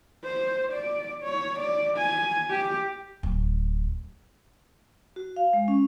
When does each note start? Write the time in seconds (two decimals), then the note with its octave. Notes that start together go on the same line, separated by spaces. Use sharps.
0.25 C5
0.72 D5
1.23 C#5
1.59 D5
1.97 G#5
2.50 G4
3.23 D1
5.16 F#4
5.36 F5
5.53 G#3
5.68 C#4